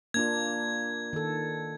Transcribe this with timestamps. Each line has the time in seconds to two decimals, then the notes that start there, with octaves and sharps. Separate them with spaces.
0.14 A#3 D4 F4 G#6
1.13 D#3 A4